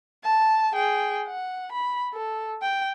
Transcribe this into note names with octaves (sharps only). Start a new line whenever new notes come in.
A5
G#4 G5
F#5
B5
A4
G5